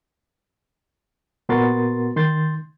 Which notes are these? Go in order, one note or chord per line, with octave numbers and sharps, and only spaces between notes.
A#2 B3 F#4 A#4 C6 A6
D#3 C6 G6 A6